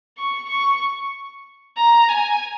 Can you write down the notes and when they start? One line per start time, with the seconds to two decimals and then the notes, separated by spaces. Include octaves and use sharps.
0.18 C#6
0.49 C#6
1.77 A#5
2.09 G#5